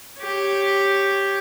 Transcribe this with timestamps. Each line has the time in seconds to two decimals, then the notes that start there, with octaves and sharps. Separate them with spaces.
0.20 G4 C#5